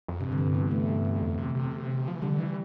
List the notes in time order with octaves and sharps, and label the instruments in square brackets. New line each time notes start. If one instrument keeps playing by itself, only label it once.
[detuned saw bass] F2
[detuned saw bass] G2 [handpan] C3
[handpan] D3
E3
B3
A3
[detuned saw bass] F2
C3
C3
F3
E3
[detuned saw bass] D3 [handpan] G3
[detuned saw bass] E3